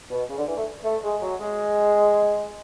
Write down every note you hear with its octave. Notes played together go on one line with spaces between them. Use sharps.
B2
C#3
D3
E3
A3
A3
G#3
F#3
G#3